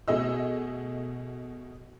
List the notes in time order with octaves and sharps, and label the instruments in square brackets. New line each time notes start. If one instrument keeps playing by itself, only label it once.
[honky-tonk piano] B2 A3 G#4 D#5 E6